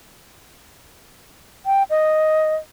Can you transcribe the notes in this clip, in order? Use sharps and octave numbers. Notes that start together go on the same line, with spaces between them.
G5
D#5